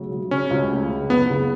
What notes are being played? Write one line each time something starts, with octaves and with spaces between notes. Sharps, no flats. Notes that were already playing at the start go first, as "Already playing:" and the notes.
Already playing: B1 C#3 F#3 A3
F#3
C#3 C#4
C#2
A3
C#3
F#1 B3
C#3